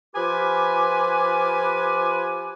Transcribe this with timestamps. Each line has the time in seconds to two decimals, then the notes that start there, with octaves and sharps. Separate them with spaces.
0.15 F3 F4 G4 B4 G#5 D6